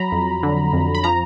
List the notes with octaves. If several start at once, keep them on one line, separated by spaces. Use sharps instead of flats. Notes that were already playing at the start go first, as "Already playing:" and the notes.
Already playing: F#3 A#5 B5
F2
D3
F2
B5
F3 A#5